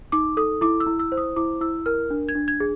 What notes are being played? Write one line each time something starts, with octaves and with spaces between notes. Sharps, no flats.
D#4 D6
A4 D#6
E4 D6
E6
E4
E6
C5
D#6
E4 D6
E4 E6
A#4 F6
D4
G#6
D4
G#6
G#4